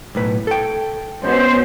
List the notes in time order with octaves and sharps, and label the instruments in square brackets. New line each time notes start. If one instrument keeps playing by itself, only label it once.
[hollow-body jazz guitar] B1 A2 B4
A4 G5
[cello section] B2 B3 C#4 [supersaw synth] C5